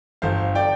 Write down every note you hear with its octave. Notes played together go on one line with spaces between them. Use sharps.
G1 C5 F5
D5 G5